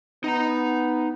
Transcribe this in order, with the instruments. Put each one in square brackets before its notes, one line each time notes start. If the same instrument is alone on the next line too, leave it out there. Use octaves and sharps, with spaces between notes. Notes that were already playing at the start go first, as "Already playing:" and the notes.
[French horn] B3 [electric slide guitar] D#4 A#5